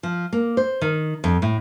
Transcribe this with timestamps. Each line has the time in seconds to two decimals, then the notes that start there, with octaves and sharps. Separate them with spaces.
0.03 F3
0.33 A#3
0.57 C5
0.81 D#3
1.24 F2
1.42 A2